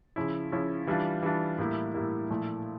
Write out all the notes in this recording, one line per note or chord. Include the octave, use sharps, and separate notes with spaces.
C#3 F3 C#4 E4
C#3 F3 C#4 E4
E3 G3 D4 F4
E3 G3 D4 F4
A2 G3 A#3 E4
A2 G3 A#3 E4
A#2 F3 A3 E4